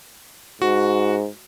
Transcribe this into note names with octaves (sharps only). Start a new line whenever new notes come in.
G#2 F#4